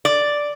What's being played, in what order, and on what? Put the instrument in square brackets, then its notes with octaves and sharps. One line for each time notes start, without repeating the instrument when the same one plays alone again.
[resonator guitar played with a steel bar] D5